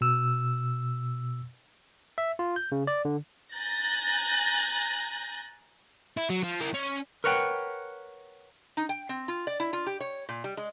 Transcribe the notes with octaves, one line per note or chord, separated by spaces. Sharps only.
B2 E6
E5
F4
G6
C#3
D5
D3
G#5 A#5 F#6 G6 A6 A#6
E4
F#3
F3
E4 A#4
C#4
A#4 B4 C#5 D#5 F#5 G5
D#4
G5
C4
F4
D5
E4
F4
G4
C#5
A#2
G3
G#3